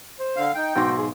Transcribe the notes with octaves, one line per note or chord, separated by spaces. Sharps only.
C5
D3 F5
D#4 G5
B1 G#2 F#4 C6
G#4